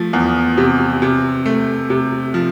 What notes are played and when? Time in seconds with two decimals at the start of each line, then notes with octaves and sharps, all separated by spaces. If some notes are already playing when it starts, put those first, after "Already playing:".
Already playing: F3 A3
0.13 E2
0.57 C3
1.02 C3
1.46 A3
1.90 C3
2.34 F3